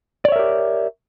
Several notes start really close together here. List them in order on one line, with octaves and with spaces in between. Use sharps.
D5 C#5 E5 A#4 G4